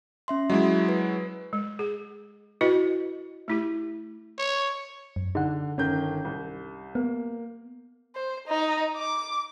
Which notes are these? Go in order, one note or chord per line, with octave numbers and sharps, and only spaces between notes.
C#4 E5 C6
F#3 G#3 E4 D#5
B4
G#3
G#4
E4 F#4 B4 D#5
A3 E4 G4
C#5
F#2
D3 D#4 F#5
G1 D#3 C#4 G6
C2
A#3 B3
C5
D#4
D6